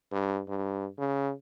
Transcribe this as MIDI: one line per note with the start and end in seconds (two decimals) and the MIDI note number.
0.12 0.40 43
0.48 0.87 43
0.98 1.32 49